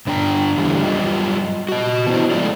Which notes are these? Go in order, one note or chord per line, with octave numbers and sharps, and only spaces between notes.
G2 D3 D4 G5 A#5
E2 D3 E3 G3 A3
F#2 G3 F4 D#5
F#4 D#5
E3 B3 D4 E4 C5
F3 G#3 A3 F4 D5